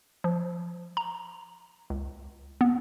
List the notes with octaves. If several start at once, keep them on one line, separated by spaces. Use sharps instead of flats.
F3
A#5
C#2
B3